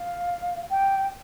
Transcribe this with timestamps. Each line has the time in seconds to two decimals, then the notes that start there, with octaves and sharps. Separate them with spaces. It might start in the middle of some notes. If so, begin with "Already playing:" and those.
Already playing: F5
0.70 G5